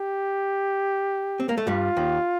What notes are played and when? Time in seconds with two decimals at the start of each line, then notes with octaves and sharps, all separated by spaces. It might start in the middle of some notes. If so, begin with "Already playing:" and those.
Already playing: G4
1.40 C4
1.49 A#3
1.58 A3
1.67 G2 G3 F4
1.97 D#2 D#3